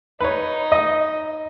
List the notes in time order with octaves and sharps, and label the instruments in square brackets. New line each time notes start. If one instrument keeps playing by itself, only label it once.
[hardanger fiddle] D#4 [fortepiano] B4 C#5
[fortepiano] D#5